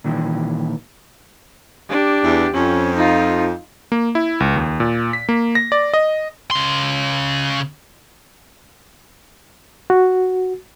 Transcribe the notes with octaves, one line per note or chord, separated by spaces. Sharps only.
A#2 D#3 E3
D4 G4
E2
F2 C#4
D#4 F4
A#3
E4
C#2
D#2
A#2
B6
A#3
A#6
D5
D#5
C#3 C6
F#4